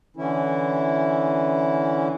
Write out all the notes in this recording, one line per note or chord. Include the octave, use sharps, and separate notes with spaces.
D3 E3 C#4 E4